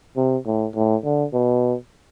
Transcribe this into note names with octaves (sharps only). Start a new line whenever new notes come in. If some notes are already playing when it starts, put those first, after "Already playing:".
C3
A2
A2
D3
B2